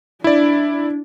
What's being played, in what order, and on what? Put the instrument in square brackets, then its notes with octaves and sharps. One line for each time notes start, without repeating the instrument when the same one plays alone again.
[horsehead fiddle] D4 [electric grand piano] E4 D5